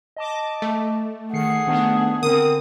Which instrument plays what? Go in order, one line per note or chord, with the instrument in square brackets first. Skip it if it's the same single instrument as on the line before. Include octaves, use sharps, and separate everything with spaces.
[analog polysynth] D#5 A5 D6
[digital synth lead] A3
[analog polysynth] D#3 C7 C#7 [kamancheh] G#4 F#5
[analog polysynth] D#3 B3 D4
[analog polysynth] D3 C4 [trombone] A#4 [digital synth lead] D#6